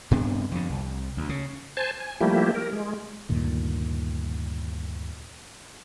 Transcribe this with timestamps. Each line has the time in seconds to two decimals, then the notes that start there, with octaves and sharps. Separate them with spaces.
0.11 G2 C3 B3 D4
0.52 F2 D3
0.70 C2
1.17 D2
1.29 C#3
1.77 C5 G#5 A5
2.00 G#5
2.21 F3 G3 A3 A#3 E4 G4
2.55 A#4
2.73 G#3
3.29 D2 G2 A#2 D#3